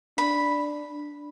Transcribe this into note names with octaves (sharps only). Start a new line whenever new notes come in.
D4 B5